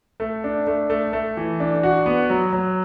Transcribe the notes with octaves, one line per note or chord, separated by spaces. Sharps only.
A3
D4
A3
A3
A3
E3
D4
F#4
B3
F#3
F#3